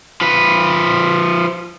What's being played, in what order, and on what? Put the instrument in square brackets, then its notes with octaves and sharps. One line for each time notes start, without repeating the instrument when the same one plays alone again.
[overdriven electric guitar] F3 B4